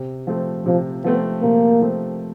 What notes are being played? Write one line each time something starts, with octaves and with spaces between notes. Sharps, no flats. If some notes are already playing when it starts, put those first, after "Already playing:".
Already playing: C3
F3 A3 C4
C3 F3
F3 A3 B3 C4
C3 A#3
F3 A3 C4